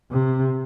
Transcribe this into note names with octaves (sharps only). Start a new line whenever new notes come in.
C3